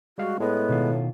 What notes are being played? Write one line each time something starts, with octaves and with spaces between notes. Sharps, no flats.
G3 G#3 F#4 F5
A2 G#3 B3 D#5
B2 D#3 F4